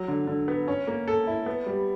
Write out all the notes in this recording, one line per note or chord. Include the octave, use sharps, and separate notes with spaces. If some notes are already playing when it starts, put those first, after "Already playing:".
Already playing: F#3
D3
D3
B3
C#4
A#3
A4
E4
B3
G3